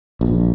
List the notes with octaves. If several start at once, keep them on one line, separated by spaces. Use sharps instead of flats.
A#1